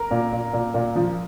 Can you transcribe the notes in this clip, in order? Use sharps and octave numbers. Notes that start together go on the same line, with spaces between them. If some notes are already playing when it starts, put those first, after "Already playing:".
Already playing: A#4
A#2
A#2
A#2
A#2
F3